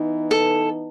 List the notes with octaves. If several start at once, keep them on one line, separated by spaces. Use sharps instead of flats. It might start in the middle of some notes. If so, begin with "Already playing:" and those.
Already playing: E3 B3 D#4
A4